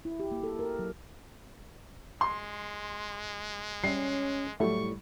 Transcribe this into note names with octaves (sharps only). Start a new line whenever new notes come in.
E4
G4
A#3
A4
A#4
F#3
G#3 C6
G3 C#4 E5 C7
A2 F#3 G3 A3 E4 C#6